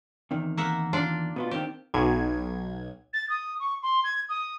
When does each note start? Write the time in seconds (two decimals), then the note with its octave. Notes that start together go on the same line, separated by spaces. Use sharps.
0.31 E2 C3 D#3
0.57 A#3 E5 F#5
0.93 D4 F4 D5
1.36 B2 B3 F4
1.51 D#3 C4 G4
1.94 B1 G#6
3.13 A6
3.29 D#6
3.59 C#6
3.82 C6
4.04 G#6
4.29 D#6